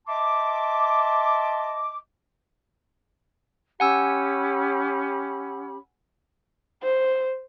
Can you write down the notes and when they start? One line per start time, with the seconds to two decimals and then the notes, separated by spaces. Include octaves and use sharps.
0.08 D#5 E5 A5 C6 D6
3.80 C#4 G4 F#5 G#5 B5 E6
6.82 C5